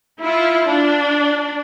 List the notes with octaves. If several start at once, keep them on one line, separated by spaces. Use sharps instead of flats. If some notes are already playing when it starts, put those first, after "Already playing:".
E4 F4
D4